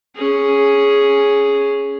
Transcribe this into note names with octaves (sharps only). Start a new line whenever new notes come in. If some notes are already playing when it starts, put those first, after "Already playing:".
C#4 G#4